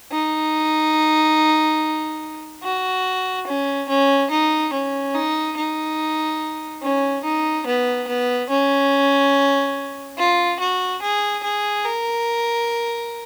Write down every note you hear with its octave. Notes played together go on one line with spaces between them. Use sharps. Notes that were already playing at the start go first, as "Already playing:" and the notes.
D#4
F#4
C#4
C#4
D#4
C#4
D#4
D#4
C#4
D#4
B3
B3
C#4
F4
F#4
G#4
G#4
A#4